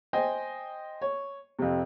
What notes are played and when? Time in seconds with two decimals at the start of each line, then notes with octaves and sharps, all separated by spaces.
0.13 C5 D#5 G5 G#5
1.01 C#5
1.59 F2 C3